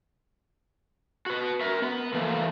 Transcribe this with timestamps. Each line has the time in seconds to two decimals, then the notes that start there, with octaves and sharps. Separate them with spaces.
1.26 F#4 B4
1.61 A#4 E5
1.82 B3
2.14 E3 F3 A3 A#3